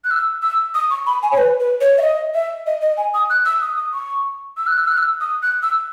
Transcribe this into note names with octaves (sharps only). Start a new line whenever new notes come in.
F#6
E6
E6
D#6
C#6
B5
G#5
C#5
B4
B4
C#5
E5
D#5
E5
D#5
D#5
G#5
D#6
F#6
E6
D#6
D#6
C#6
E6
F#6
E6
F#6
E6
D#6
F#6
E6